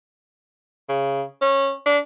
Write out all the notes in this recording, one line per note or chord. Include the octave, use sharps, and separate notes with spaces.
C#3
C#4
D4